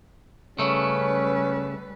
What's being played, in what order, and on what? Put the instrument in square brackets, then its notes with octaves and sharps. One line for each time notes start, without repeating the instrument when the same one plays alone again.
[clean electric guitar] C#3 A3 [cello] G3 B4 [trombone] C#4